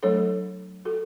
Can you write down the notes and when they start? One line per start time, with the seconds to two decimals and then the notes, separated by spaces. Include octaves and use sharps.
0.03 F#3 A3 D4 A4 C#5
0.85 F#4 A4